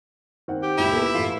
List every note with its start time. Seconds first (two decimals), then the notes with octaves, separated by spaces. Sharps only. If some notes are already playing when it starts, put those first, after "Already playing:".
0.48 D#3 C4 F#5
0.63 G4
0.78 D#1 C#2 E4 F7
0.91 B3 A4 A#4
1.15 A2 E3 F4